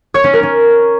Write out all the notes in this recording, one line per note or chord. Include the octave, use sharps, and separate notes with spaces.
C#5
C#4
A#4
C#4